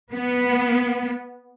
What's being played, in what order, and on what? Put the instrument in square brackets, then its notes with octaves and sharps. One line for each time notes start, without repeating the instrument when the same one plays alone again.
[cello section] B3